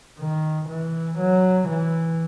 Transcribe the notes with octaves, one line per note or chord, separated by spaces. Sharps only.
D#3
E3
F#3
E3